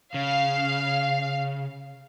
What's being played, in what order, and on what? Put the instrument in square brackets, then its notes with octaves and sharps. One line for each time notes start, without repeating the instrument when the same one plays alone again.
[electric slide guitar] C#3 [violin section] F5